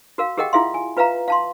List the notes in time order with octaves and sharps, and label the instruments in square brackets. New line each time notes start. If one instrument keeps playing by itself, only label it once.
[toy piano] F#4 A#4 F5
G4 G#4 A#4 D#5 F#5 G5
E4 F4 G#4 E5 F5 C6
G#5
F4 B4 E5 F5 A#5
F5 A5 C6